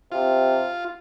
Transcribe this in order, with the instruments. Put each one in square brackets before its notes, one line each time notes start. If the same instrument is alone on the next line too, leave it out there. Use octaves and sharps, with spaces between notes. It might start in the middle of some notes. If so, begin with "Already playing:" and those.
[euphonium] C3 [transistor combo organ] F4